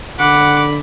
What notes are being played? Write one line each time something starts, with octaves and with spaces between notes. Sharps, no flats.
D3 F#5 B5 D6